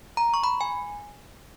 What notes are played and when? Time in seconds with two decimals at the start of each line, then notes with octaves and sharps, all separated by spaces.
0.17 A#5
0.34 C#6
0.44 B5
0.61 G#5